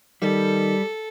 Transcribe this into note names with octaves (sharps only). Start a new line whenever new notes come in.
D#3 G3 A4